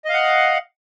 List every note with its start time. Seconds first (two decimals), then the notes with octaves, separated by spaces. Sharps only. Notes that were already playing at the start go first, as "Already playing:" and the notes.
0.05 D#5
0.09 F5
0.13 F#5